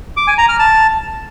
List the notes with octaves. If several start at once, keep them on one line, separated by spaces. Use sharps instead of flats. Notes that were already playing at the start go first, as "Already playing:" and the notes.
D6
G#5
A#5
F6
A5